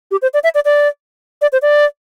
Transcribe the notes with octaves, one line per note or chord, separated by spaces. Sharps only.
G4
C5
D5
E5
D5
D5
D5
C5
D5